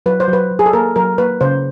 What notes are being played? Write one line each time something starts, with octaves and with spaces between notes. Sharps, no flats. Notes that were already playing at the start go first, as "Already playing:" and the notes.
F#3 B4
C5
F#3
B4
F#3
G#4
A4
A#3 A#4
F#3 A#4
A#3 B4
C#3 C5